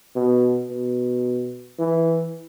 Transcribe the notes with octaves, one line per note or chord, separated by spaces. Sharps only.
B2
B2
E3